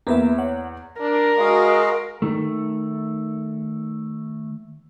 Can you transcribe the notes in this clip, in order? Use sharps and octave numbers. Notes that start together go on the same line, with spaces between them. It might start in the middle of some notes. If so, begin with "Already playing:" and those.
E2 A#3 B4 E5
C#5 F#5
D4 A#4
G#3 F#4 D#5 F5
D#3 A3